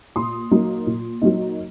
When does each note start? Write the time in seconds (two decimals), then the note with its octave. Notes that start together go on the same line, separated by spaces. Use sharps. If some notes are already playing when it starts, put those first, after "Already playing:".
0.16 A#2 C6 D#6
0.51 F#3 A#3 D#4
0.87 A#2
1.22 F#3 A#3 D#4